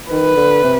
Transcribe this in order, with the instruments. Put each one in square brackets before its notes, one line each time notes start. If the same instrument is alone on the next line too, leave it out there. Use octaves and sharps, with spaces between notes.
[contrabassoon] D#3 [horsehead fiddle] B4
[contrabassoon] D3
C3